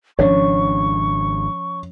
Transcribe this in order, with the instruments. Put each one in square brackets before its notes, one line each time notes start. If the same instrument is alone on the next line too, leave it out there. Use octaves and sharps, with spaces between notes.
[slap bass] G#1 C#3 D4 [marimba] F3 C#4 [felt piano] C#5 [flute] C#6